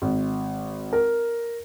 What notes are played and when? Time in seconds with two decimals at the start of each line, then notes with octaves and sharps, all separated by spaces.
0.02 G#1
0.93 A#4